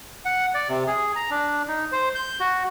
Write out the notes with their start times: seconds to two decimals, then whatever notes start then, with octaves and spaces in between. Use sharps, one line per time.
0.25 F#5
0.55 D5
0.69 C3
0.87 G#4
1.16 A#5
1.31 D4
1.68 D#4
1.92 C5
2.15 G6
2.40 F#4